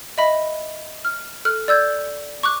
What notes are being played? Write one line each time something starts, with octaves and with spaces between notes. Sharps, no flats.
D#5 E5 B5
F6
A4 F6 F#6
D5 E6 G6 G#6
C#6 D6 F#6